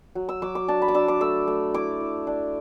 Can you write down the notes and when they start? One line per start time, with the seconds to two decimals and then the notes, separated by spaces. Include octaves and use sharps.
0.15 F#3
0.29 E6
0.42 F#3 D6
0.55 D6
0.68 D4 A5
0.82 B5
0.88 D6
0.95 D4 E6
1.08 D6
1.21 A3 E6
1.48 A3
1.74 E4 D6
2.00 E4
2.27 D4